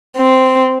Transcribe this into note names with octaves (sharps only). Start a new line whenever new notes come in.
C4